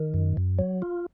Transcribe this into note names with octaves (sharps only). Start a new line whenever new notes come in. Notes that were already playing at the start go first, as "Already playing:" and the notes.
Already playing: D#3
F#2
F#2
F#3
F4